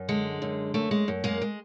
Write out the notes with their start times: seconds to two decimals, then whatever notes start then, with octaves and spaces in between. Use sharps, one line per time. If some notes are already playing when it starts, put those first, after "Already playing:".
Already playing: F#2
0.09 D3 G#3
0.42 F#2
0.74 F#2 A3
0.91 G#3
1.08 F#2
1.24 G#3 A#3
1.41 G#3